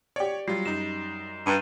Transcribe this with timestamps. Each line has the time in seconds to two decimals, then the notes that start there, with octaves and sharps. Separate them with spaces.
0.16 G4 C#5 D5
0.48 F#3 G3 F4 C7
0.65 F#2 D#4 E7
1.47 G2 A#5 D#7